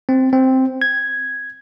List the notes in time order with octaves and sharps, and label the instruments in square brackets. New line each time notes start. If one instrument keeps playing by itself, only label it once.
[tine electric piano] C4
C4
G#6